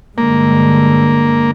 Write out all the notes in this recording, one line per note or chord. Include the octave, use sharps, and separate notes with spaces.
G2 D3 G#3 A#3